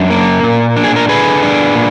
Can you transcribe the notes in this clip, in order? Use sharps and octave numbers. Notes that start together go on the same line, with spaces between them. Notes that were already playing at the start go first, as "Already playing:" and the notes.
Already playing: F#2 D4
A#3
A#2
D4
G#4
A#4
D3 G#4 B4
D4
A#2